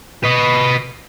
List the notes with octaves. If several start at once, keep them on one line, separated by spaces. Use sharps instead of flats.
B4 D#5